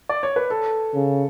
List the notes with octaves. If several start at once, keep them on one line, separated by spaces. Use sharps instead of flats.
D5
C#5
B4
A4
C#3